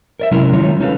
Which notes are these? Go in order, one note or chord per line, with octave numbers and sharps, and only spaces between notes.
A#4 D5 E5
C3 F#3 G#3 C#4 E4 A#4
D#3 G3 G#3 F4 C#5 A#5
C#4 D#4 F#4 A4 B4 F5